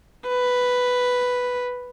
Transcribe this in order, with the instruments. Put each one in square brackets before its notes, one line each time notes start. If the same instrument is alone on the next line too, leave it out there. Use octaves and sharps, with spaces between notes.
[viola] B4